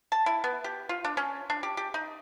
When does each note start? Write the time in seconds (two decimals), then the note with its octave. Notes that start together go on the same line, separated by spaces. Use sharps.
0.12 A5
0.26 E4
0.44 B3
0.64 G4
0.89 F4
1.04 D4
1.17 C#4
1.50 D4
1.63 G4
1.77 G4
1.94 D#4